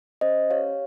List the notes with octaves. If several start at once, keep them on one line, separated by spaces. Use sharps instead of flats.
C#4 C5 D#5
G4 C#5 F5